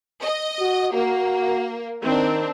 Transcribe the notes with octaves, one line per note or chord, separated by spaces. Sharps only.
D#5
F#4
A#3 F#4
D#3 C4 D4